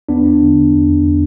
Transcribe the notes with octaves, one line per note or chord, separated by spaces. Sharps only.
E2 B3 D4
D3
E2